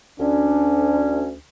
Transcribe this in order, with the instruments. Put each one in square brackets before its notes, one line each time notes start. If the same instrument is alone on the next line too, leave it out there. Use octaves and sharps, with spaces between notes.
[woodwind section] D2 C#4 [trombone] D4